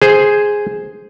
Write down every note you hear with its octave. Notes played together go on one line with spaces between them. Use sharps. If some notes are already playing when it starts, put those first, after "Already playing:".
G#4 C5